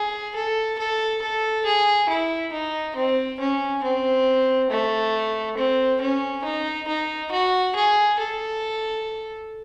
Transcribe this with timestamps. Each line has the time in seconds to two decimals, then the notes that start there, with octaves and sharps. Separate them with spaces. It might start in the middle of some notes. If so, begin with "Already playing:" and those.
Already playing: G#4
0.35 A4
0.79 A4
1.22 A4
1.65 G#4
2.09 E4
2.53 D#4
2.96 C4
3.40 C#4
3.84 C4
4.70 A3
5.58 C4
6.01 C#4
6.44 D#4
6.88 D#4
7.32 F#4
7.75 G#4
8.19 A4